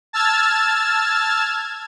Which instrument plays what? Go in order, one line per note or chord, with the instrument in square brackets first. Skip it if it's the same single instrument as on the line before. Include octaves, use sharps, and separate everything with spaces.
[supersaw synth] A5 E6 F6 G#6 A6